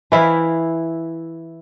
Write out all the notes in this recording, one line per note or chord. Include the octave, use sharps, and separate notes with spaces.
E3 E4 F5